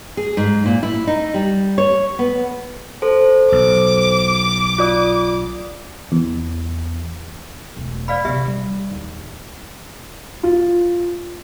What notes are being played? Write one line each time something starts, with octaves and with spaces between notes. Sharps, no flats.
G#4
G#2
A#2
E4
D#4
G3
C#5
B3
A4 C5
B1 D6
F4 D5 D#6
E2
E1 A3
D5 F5 B5
C3 B3 G4 E5
G3
A1 D#2
F4